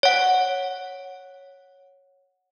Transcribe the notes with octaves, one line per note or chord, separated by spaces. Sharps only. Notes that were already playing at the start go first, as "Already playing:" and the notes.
C#5 F#5